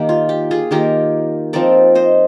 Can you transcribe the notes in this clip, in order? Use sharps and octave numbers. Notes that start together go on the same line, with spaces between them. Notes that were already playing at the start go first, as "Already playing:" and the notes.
Already playing: D#3 A#3 G4
F4
G4
F4 G#4
D#3 A#3 F4 G4 A#4
F3 C4 D#4 A#4 D5
C5 D#5